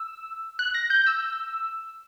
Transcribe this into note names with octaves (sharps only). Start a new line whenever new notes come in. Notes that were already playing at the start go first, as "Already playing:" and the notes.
Already playing: E6
F#6
A#6
G6
E6